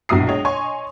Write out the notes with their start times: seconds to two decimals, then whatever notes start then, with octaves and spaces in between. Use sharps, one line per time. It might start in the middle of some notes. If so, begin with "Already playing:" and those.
0.09 A#1 B2 F#3 E4 D#6 C7
0.28 G#3 C#5 D#5 G5
0.45 C#5 D#5 G#5 C6 C#6